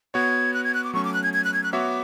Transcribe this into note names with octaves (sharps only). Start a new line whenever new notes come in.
B3 F#4 C#5 G#6
F#6
G#6
F#6
D6
F#3 A3 C#4 C#6
D6
F#6
G#6
G#6
F#6
G#6
F#6
B3 F#4 C#5 E5 D6